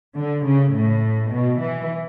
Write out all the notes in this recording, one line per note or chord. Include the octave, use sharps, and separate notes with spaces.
D3
C#3
A2
B2
E3